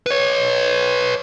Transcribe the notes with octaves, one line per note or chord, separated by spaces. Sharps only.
B4 C#5